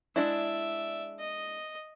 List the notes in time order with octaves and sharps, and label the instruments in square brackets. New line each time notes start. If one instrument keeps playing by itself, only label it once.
[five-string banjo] G#3 D4 E4 [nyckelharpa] D5 E5
[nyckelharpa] D#5